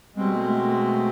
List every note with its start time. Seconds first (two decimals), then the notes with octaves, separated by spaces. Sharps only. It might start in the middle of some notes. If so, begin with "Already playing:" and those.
0.15 B2 G3 G#3 C4
0.35 A3
0.53 A3
0.72 A3